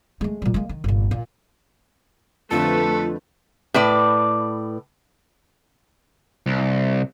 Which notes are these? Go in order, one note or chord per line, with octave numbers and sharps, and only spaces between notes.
G#3 A3
A#2 G3
G#3 A#3
D#3
G1 A#2
A#2
F2 D3 F3 A3 F4 A4 B4
A2 B4 D5
C2